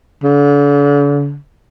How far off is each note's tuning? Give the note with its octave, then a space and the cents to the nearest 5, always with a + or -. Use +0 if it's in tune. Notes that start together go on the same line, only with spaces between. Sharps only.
D3 -40